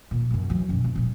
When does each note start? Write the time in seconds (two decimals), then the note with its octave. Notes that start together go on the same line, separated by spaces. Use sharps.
0.11 F2 A#2
0.31 F#2 C3
0.50 E3 F#3
0.69 F#2 B2
0.84 F2 C4
0.95 A#2 G3